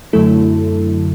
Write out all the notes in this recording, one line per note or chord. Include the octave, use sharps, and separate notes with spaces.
F#2 D3 F#3 A3 E4 A4